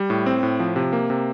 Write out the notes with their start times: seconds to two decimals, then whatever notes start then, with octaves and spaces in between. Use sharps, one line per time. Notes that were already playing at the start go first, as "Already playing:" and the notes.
Already playing: G3
0.10 A2
0.26 C4
0.43 A2
0.60 F3
0.76 C3
0.93 A#3
1.10 C3